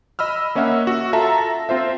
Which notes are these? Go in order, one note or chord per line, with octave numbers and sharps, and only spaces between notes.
D#5 B5 E6 F6
A#3 C#4 D#5 E5 F#5
F#4
F4 A4 E5 A5 A#5
A#6
C4 F4 C5 E5